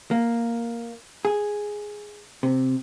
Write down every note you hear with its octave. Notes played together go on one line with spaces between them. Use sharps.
A#3
G#4
C3